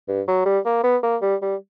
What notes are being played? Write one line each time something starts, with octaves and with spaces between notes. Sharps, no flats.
G2
F#3
G3
A#3
B3
A#3
G3
G3